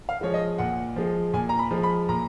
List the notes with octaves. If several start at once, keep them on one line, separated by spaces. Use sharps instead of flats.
F5
F3 G#3 C#5
D#5
A#2 F#5
F3 G#3
A#2 G#5
A#5
B5
F3 G#3
B5
A#2 A#5